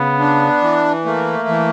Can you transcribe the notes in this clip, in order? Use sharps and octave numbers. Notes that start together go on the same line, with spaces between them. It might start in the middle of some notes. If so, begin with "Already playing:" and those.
Already playing: C#3 B3
D4
E3
A3 A#3
E3